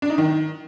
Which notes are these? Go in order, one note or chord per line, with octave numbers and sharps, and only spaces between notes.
D4
D#4
D#3